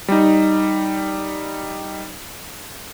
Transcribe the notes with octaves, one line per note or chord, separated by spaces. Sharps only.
G3 D#4